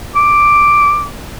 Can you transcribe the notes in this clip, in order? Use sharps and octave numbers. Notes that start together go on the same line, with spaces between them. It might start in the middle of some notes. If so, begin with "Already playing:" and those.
D6